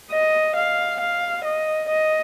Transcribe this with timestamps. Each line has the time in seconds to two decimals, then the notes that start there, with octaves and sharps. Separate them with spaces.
0.12 D#5
0.56 F5
1.01 F5
1.45 D#5
1.89 D#5